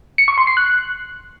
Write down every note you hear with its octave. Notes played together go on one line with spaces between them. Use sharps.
C#7
C#6
C6
C7
F#6